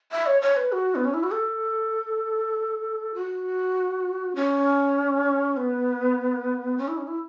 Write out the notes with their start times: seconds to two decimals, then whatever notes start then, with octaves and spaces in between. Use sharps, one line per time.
0.12 E5
0.26 C#5
0.42 C#5
0.57 B4
0.72 F#4
0.95 B3
1.05 C#4
1.14 E4
1.23 F#4
1.32 A4
3.14 F#4
4.36 C#4
5.57 B3
6.78 C#4
6.88 E4
6.97 C#4
7.07 E4